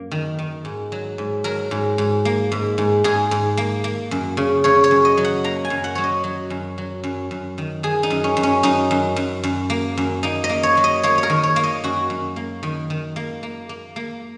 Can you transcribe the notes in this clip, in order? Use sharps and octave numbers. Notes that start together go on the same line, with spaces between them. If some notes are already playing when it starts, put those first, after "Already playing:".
Already playing: F#2 A#3
D#3
D#3
G#2
F#3
G#2
F#3 A#4
G#2
G#2
A#3
G#2
G#2
G#2 G#4
G#2
A#3
A#3
F#2
C#3
C#3 C#5
C#5
F#2
D#5
F#3
F#5
A#3 A#5
G#5
F#2
F#5
F#3 C#5
D#5
F#3
F#2
F#3
F#2
F#2
D#3
D#3 G#4
D#4
F#2
C#4
F#2
C#4
F#2 D#4
F#2
F#2
F#2
A#3
F#2
A#3 D#4
D#5
A#3
C#5
F#3
D#5
A#3 C#5
C#5
A#4
D#3
C#5
A#3
D#5
F#2 F#4
F#2
A#3
D#3
D#3
A#3
A#3
A#3
A#3